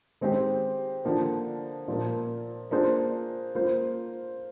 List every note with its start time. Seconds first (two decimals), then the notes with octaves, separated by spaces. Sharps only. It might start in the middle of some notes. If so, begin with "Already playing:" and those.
0.21 D#3 G#3 C4 G4
1.05 D3 F3 A#3
1.88 A#2 F3 A#3
2.71 A#3 D4 F4 G#4 C5
3.55 A#3 F4 C5